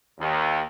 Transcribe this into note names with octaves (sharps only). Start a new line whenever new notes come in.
D#2